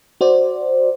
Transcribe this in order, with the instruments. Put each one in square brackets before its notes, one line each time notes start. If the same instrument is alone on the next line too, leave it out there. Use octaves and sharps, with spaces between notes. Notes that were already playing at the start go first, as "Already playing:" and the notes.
[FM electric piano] F#4 C5 D5